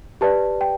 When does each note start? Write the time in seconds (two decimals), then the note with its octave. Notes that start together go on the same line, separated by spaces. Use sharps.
0.21 G4 B4 D5 A5
0.61 G5